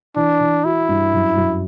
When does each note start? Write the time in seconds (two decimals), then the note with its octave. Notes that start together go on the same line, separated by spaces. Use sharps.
0.16 E3 D4
0.41 E3
0.64 E4 F#4
0.89 G2
1.13 F#2
1.37 F#2